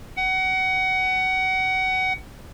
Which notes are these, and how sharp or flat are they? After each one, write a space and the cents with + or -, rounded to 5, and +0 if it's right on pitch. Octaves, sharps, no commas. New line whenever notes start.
F#5 +25